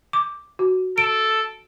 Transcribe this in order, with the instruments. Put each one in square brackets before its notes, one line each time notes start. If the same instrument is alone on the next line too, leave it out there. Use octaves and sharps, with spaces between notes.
[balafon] D6
F#4
[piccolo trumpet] A4 [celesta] D7